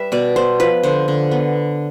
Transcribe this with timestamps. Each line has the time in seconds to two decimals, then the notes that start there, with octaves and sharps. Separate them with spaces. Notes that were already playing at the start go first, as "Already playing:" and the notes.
Already playing: G3 B4 E5
0.12 B2 D5
0.36 B3 C5
0.60 F3 B4
0.83 D3 C5
1.08 D3
1.31 B3